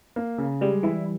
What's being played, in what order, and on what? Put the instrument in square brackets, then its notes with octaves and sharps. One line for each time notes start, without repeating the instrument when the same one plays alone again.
[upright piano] A#3
C#3
[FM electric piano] G3 [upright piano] G#3
[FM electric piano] E3 [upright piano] E4